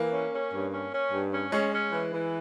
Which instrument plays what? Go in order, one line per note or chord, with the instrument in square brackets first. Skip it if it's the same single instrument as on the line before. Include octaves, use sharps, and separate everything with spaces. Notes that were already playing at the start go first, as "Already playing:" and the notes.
Already playing: [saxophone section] E3 [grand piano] A#3
[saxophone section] C#4
C#4
G2
C#4
C#4
G2
C#4
[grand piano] G#3 [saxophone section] C#4
[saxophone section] C#4
E3
E3